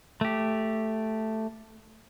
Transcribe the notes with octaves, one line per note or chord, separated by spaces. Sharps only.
A3 G4